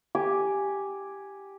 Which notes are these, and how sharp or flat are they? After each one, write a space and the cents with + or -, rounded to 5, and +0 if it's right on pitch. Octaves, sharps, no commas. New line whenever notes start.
G4 +0 G#5 +0 D6 +0